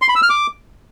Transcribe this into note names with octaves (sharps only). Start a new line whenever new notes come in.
C6
B5
E6
F6
D6